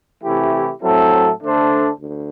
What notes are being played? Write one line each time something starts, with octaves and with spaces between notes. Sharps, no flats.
C3 E3 A3 E4 G4
A2 F#3 C4 E4 A4
D3 A3 D4 A4 C5
D2